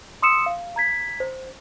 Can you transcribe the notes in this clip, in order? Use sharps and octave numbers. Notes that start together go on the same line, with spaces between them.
C6 D#6 E6 C#7 E7
F5
A#5 G#6 B6
C5